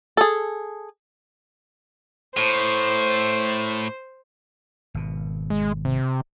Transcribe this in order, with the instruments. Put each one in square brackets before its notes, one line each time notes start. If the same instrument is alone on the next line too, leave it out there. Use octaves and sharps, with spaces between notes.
[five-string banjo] G#4 A4
[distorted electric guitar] A2 [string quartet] C5
[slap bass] G#1 B2
[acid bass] G#3
C3